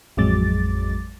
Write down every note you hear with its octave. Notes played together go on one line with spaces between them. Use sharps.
A1 F2 F#3 G#3 D6 A6